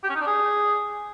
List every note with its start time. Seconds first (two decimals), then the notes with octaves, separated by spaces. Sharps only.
0.03 G4
0.09 C#4
0.15 D#4
0.21 D4
0.27 G#4